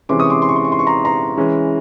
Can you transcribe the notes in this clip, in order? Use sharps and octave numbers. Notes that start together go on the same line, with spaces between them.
C3 E3 G#3 C#4 C6 D6
C#6 D#6
C6 D6
C6
C#6
C6
C#6
C6
C#6
A#5 C6
A#5 C6
E3 G#3 C#4